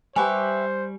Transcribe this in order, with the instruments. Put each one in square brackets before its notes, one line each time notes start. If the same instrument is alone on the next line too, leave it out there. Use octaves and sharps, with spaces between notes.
[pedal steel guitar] G3 C#6 [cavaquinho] G4 B4 E5 [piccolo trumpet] C5 [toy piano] G#5